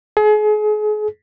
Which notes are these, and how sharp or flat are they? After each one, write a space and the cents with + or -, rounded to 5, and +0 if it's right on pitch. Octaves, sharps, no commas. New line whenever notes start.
G#4 +35